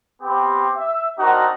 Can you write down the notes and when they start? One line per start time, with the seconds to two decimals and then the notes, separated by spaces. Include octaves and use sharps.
0.22 B3 C4 G4
0.77 E5
1.19 C4 D4 D#4 F#4 A#4